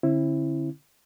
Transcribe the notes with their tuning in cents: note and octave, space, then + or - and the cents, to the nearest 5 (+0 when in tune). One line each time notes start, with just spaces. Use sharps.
D3 -15 C4 +40 E4 +0